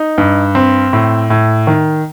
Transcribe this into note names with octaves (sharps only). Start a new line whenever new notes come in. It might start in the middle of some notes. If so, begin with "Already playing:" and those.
Already playing: D#4
G2
C4
A2
A2
D#3